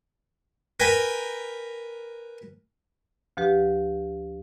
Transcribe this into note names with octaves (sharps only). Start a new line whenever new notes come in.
A#4 B4 G5 G#5
D2 F3 G4 B4